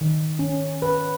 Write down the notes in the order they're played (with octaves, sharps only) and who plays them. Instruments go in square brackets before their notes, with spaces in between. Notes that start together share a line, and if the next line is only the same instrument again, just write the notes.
[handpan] D#3
C#4
B4